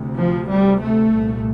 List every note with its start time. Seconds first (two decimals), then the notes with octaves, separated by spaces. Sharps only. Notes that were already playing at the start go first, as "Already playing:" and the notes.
Already playing: D2 C3
0.15 F3
0.48 G3
0.80 A3
1.12 C2 A#2